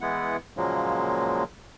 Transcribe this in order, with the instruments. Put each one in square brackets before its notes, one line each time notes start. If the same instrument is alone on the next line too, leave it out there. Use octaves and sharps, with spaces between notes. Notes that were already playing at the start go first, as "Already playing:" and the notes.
[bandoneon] E3 G#3 B3 E4 F#5
A#2 C#3 F3 F#3 G#3 A#3